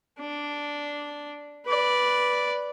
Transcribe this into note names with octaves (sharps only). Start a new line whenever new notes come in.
D4
B4 D5